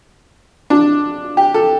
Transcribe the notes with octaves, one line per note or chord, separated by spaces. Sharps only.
D4
G4
A4